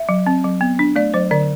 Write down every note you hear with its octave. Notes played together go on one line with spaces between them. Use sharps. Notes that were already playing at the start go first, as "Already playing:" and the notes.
Already playing: E5
F#3
C4
F#3
B3
D4
A3 D5
F#3 C5
D3 D5